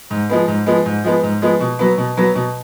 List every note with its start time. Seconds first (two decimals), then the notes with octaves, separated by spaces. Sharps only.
0.11 G#2
0.29 F3 G#3 B3
0.48 G#2
0.66 F3 G#3 B3
0.86 G#2
1.04 F3 G#3 B3
1.23 G#2
1.42 F3 G#3 B3
1.60 B2
1.79 F#3 B3
1.98 B2
2.17 F#3 B3
2.35 B2